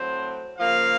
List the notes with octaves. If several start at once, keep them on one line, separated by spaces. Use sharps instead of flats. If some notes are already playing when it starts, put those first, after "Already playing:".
Already playing: A2 F#3 C4 C5
C#3 F3 A#3 F5